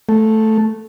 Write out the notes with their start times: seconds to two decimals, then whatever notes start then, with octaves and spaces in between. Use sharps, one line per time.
0.09 A3